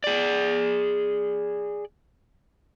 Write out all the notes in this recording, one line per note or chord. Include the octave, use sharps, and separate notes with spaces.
G#4 D5